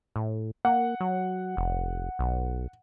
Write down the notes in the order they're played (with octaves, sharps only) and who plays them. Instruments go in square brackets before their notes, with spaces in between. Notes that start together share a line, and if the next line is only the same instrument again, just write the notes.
[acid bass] A2
[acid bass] A#3 [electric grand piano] F#5
[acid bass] F#3
F1
B1